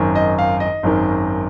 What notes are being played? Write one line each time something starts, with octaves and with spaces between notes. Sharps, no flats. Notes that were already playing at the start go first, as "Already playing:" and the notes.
Already playing: G#1 F#2 D#3
D#5
F5
D#5
G#1 F#2 D#3